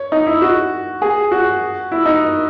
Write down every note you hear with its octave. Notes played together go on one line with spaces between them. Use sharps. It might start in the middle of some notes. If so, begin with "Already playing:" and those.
Already playing: C#5
D#4
E4
F#4
G#4
F#4
E4
D#4